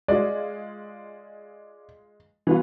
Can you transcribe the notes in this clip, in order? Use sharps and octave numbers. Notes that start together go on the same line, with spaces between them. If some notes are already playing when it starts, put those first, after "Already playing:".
G#3 F4 D5
E3 B3 F4